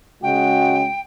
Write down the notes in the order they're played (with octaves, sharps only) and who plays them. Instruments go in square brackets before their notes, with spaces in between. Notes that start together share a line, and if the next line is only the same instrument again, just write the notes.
[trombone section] C#3 G#3 F#4 [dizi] G5